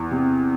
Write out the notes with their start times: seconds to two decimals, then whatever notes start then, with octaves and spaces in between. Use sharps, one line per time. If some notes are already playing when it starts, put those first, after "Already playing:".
Already playing: E2
0.11 C3